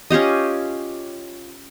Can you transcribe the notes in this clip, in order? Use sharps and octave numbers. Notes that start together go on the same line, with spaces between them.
C#4 F4 G4 D#5